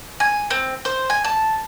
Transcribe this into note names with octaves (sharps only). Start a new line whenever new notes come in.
G#5
C4
C5
G#5
A5